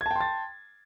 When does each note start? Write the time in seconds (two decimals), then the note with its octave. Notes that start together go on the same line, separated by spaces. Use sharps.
0.01 G#6
0.06 A5
0.11 G5
0.16 C6
0.21 A6